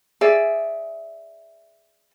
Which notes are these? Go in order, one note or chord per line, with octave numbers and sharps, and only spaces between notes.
G#4 D5 E5